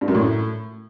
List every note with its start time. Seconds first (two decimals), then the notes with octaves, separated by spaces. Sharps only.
0.01 G2
0.08 F#2
0.15 A2